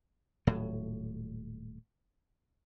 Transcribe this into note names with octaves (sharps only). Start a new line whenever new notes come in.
D#1 A2 F#3